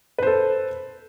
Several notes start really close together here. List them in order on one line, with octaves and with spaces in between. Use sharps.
B4 C5 A4